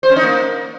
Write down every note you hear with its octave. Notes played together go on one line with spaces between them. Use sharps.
C5
C#4
D#4
A#3